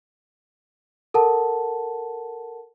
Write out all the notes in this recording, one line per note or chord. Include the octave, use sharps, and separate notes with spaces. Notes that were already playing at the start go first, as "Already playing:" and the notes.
A4 A#4 F#5 A5